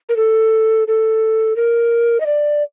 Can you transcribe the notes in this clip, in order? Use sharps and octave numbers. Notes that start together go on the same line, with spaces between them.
A#4
A4
A4
A#4
D#5
D5